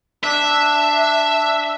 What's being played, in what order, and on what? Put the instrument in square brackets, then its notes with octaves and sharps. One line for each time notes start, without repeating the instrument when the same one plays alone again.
[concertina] D4 [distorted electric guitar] E5